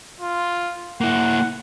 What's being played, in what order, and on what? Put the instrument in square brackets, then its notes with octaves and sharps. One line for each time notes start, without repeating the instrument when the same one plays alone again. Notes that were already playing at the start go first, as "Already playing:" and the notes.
[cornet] F4
[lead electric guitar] A#3 E4 [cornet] F#5